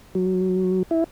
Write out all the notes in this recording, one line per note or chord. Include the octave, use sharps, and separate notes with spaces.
F#3
E4